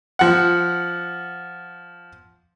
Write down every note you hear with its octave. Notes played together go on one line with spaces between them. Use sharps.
F3 F#5